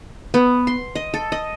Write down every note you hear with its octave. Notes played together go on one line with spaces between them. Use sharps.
B3
C6
D#5
A4
D#5